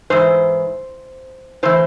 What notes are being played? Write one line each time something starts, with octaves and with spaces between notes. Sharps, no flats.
G#2 E3 C5
A2 E3 C5